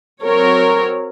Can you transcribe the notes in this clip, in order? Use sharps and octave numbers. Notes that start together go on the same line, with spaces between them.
F#3 C4 A#4 C#5